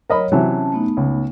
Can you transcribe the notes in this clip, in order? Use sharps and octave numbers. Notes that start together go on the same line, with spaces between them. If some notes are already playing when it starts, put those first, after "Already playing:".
F#3 A#4 C#5 D#5 B5
C3 E3 F#3 C#4 A5
A3 B3 D#4
C#2